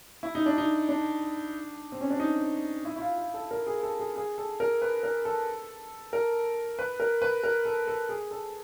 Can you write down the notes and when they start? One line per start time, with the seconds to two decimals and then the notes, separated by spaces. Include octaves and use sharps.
0.23 E4
0.35 D#4
0.46 D4
0.58 D#4
0.89 D4
1.92 C4
2.01 C#4
2.10 D4
2.20 D#4
2.85 E4
2.96 E4
3.01 F4
3.18 F4
3.34 A4
3.51 A#4
3.67 G#4
3.83 A4
4.00 G#4
4.16 G#4
4.38 A4
4.60 A#4
4.82 B4
5.03 A#4
5.25 A4
6.13 A#4
6.79 B4
7.00 A#4
7.22 B4
7.44 A#4
7.65 A4
7.88 A4
8.09 G#4
8.31 A4